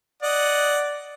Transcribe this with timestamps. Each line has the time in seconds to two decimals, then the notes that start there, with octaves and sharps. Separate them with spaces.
0.22 D5 D#5 F#5